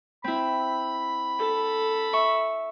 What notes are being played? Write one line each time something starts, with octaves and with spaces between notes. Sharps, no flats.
C4 E4 B5
A4
E5 C#6